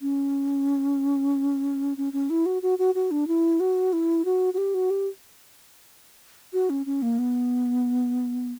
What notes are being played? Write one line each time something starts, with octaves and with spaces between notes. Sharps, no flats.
C#4
C#4
C#4
E4
F#4
F#4
F#4
F#4
D4
E4
F#4
E4
F#4
F#4
G4
F#4
G4
F#4
C#4
C#4
A#3
B3